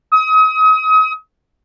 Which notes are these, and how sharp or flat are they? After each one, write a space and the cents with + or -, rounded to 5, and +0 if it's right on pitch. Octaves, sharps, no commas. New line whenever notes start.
D#6 +35